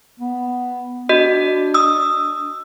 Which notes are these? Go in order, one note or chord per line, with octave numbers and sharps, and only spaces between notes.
B3
D4 F#4 D#5
D#6 E6